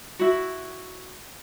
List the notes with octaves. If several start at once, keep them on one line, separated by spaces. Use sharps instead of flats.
E4 F#4